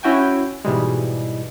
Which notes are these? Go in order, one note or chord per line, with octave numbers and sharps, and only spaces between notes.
C#4 E4 F#4 G5 G#5
G#2 B2 E3 G3 G#3